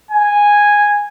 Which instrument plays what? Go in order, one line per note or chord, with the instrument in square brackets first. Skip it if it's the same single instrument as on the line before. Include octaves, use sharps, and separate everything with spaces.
[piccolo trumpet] G#5